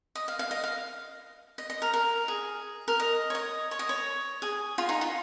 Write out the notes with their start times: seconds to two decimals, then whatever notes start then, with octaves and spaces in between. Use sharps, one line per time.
0.15 D#5
0.28 F5
0.39 F5
0.51 D#5
0.64 F5
1.58 D#5
1.70 D#5
1.82 A#4
1.94 A#4
2.28 G#4
2.88 A#4
3.00 D#5
3.30 C#5
3.35 D#5
3.71 C#5
3.79 D#5
3.89 C#5
4.42 G#4
4.78 F4
4.89 D#4
5.01 F4